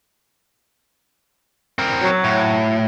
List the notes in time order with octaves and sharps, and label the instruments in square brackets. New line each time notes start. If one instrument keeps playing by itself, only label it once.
[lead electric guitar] C4 A#4
[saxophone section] F#3
[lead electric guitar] A2